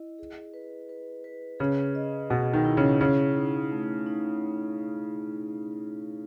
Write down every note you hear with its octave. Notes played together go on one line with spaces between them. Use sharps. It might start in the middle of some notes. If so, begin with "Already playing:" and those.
Already playing: E4 D#5
G#4
B4
B4
B4
C#3 G#4
D#5
B2 G#4
D#3
E4
C#3
C#3 G#4
D#4
A3
D#4